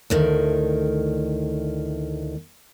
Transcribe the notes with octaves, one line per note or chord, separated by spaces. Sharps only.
D2 A2 D#3